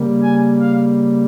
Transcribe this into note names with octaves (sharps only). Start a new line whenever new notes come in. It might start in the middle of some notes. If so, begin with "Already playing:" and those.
Already playing: C#3 G3 A#3
G#5
F5